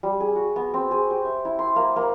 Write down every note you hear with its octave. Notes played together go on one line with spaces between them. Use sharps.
G3
G#4
F#4
B3
C4
G#4
G4
E5
E4
C6
A#3
A#3